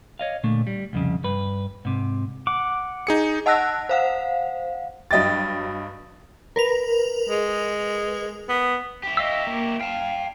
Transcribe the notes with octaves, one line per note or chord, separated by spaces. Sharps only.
C#5 D#5 F5
A#2 D3 A3
G3
C2 F2 C#3
G2 B4
G#2 C3
F#5 D6
D#4 G#4 C#7
D#5 F#5 A5 E6 F#6 A#6
C5 F5 F#5
G2 F#3 D#5 G5 A6
A#4 B4 F7
G#3
B3
E4 G4
D#5 F5 E6
A#3
F5 G5 A5